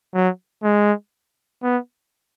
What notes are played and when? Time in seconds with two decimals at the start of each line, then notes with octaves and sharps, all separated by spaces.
0.14 F#3
0.63 G#3
1.63 B3